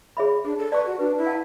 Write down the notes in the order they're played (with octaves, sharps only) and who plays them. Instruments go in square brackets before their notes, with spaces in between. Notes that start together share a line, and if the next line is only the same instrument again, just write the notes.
[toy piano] G#4 C#5 E5 B5
[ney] D4 [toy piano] G#4
[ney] A4
[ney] B4 [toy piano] D5 A5 C#6
[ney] F#4
[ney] D4 [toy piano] B4
[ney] E4
[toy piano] F#5 A5